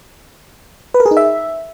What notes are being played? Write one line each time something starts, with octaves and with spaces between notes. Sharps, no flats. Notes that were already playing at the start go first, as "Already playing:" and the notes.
B4
A#4
G#4
D#4
E5